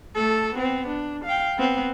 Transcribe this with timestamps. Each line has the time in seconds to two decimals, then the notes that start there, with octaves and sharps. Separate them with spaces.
0.15 A3 A4
0.55 B3 C4
0.88 D4
1.25 F5 G5
1.58 B3 C4